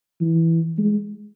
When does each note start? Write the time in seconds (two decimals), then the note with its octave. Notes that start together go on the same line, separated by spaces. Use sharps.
0.21 E3
0.78 G#3